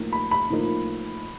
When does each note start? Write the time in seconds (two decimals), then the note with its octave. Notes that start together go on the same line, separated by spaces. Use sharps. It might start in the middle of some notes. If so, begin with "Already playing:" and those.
Already playing: A2 F3 A#3 D#4
0.13 B5
0.31 B5
0.50 A2 F3 A#3 D#4